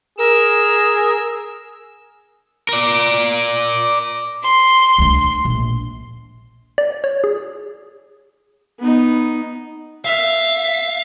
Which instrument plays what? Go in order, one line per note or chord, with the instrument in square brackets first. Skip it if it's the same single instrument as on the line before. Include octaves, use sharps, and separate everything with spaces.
[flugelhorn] G#4 [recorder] A#4 [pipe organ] E6
[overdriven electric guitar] A#4 D5
[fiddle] C6
[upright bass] D2 D3
A#1
[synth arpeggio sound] D5
C#5
G#4
[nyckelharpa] B3 D#4
[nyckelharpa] E5 [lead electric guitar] F5